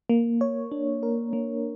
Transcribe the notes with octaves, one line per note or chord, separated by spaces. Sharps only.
A#3
C#5
D4
A#4
A#3